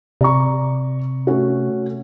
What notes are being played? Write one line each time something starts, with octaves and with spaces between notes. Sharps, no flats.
C3 D5 A#5 C#6
A3 C#4 F#4